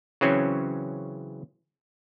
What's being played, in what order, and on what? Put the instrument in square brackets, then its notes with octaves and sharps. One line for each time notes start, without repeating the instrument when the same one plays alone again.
[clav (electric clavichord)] C#3 E3 F#3 C4 C#4